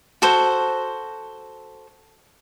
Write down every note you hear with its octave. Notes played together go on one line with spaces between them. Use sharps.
F#4 A4 C5